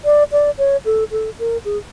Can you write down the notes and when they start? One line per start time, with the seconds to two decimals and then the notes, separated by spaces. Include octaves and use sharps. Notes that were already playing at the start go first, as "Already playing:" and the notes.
0.05 D5
0.32 D5
0.58 C#5
0.85 A4
1.11 A4
1.39 A#4
1.65 G#4